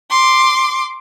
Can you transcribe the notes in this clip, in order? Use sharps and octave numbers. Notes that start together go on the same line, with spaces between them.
C6 D6